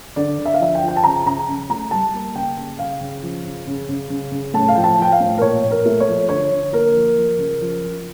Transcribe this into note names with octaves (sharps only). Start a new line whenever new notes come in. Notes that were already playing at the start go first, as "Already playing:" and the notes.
D3 D5
D3
E5
F5
F3 E5
G5
F3
G5
A5
C#3 A#5
C#3 A#5
C#3
A3 A#5
G3 A5
A#3
C#3 G5
C#3
C#3 F5
C#3
F3
C#3
C#3
C#3
C#3
C#3
A2 A5
F5
F3 G5
A5
F3 G5
F5
A2
A#4
A#2 C#5
A#2
A#4
A3
C#5
F3
D3 C#5
D3
A#3 A#4
F3
F3
C#3
F3
F3